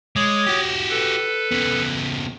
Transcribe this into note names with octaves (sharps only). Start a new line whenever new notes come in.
G#3 C#5 D6 D#6
F#4 G4
A4 B4
C#3 B3